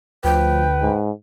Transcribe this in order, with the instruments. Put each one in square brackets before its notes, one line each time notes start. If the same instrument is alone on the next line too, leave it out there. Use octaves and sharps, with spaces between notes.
[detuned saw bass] D2 [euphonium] F3 [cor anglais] B4 [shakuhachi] G5
[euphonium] G#2